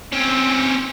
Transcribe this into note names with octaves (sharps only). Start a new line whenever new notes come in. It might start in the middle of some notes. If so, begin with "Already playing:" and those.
C4 C#4